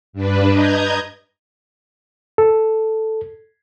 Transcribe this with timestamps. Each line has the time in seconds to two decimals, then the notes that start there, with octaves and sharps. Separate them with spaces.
0.13 G2 D4 B4
0.51 D#5 A#5 G6 G#6
2.38 A4